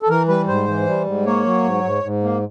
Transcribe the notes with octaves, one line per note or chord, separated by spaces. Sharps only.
A4
E3 A#4
G3 B4
G#2 C5
E3
G3
G#2
A#3 C#5
F#3
G#2
G#2
G#2
A#3